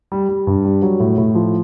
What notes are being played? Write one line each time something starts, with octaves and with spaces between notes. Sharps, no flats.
G3
G3
G2
G3
F#3
A2
A2
F3